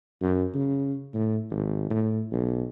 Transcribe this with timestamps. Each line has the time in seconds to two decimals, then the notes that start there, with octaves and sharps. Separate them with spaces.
0.21 F#2
0.54 C#3
1.14 A2
1.51 G#1
1.90 A2
2.32 B1